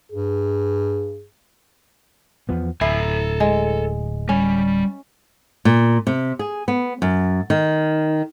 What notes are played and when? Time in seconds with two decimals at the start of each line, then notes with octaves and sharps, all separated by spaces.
0.12 G2 G#4
2.49 E2 F3 B3
2.81 D1 E4 A4 G#5
3.40 G#3
4.29 G3 C#4
5.65 A#2
6.07 C3
6.39 G#4
6.68 B3
7.02 F#2
7.50 D#3